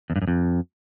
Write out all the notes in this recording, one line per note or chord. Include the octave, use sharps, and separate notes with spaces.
E2
G2
F#2
F2